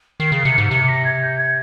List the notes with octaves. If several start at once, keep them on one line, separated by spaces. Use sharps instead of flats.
D#3 C7
C#3 C7
C3 C#7
G#2
C3 C#7
A#6
G#6
G6
G#6